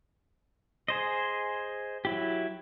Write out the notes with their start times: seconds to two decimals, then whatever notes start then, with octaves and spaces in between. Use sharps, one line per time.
0.88 G#4 C5 D#5
2.05 F#3 E4 G4